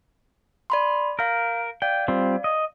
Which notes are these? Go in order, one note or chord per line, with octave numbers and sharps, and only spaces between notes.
D5 B5 C6
A#4 F5 G6
D5 F5 G5
G3 C4 F4
D#5